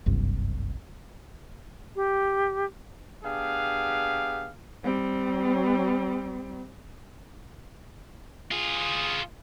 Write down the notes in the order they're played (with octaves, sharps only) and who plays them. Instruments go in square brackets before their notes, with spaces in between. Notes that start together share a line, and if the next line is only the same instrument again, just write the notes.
[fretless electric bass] F#1 C2 G2
[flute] G4
[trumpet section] B3 D4 G4 G#4 F5
[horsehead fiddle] G3 C4
[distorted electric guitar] F4 G#4